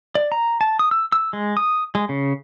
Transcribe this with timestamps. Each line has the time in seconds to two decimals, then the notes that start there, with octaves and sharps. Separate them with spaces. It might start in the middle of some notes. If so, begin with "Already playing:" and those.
0.15 D5
0.32 A#5
0.61 A5
0.79 D#6
0.91 E6
1.12 E6
1.33 G#3
1.57 D#6
1.95 G#3
2.09 C#3